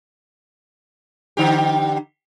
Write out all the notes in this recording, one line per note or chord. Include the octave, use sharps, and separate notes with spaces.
D3 D#4 G4